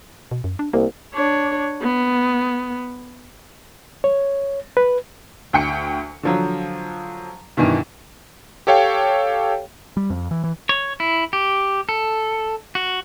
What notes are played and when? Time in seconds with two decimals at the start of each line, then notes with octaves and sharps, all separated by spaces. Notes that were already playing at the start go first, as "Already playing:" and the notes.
0.31 B2
0.44 F#2
0.59 D4
0.73 C2 A#3
1.14 D4 C#5
1.82 B3
4.04 C#5
4.77 B4
5.53 D2 G5 C#7
6.23 D3 F3 F#3
7.57 G2 B2 D#3 E3
8.67 G4 A4 C#5 F5 G5
9.97 G3
10.10 F2
10.31 E3
10.44 E3
10.69 C#5
11.00 E4
11.33 G4
11.89 A4
12.75 F#4